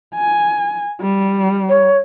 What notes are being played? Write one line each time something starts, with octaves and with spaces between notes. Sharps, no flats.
G#5
G3
C#5